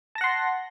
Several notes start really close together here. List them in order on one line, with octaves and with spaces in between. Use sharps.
A5 A#6 F#5 C6